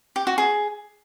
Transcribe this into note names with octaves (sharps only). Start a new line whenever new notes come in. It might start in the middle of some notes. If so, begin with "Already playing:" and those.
G4
F#4
G#4